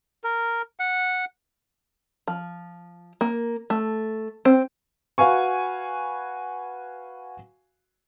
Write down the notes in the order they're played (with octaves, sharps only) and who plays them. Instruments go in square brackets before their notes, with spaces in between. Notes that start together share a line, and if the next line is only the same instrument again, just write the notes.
[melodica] A#4
F#5
[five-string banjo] F3
A#3
A3
C4
[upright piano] F#4 B4 F5 G#5 C#6